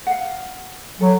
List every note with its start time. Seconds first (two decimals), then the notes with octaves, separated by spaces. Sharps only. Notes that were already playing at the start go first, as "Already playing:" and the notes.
0.07 F5 F#5
1.00 F#3 A4